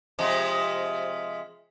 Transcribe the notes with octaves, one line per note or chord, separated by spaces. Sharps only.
C3 F3 G#3